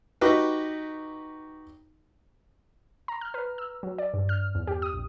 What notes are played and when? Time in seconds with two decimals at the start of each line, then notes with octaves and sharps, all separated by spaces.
0.21 D#4 F#4 G4 B4
3.08 A#5
3.21 F6
3.34 B4
3.58 E6
3.83 F#3
3.98 D5
4.14 G2
4.29 F6
4.55 E2
4.67 G4
4.82 D#6
4.93 A#1